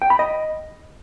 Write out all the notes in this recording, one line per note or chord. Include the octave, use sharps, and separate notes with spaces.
G5
B5
D#5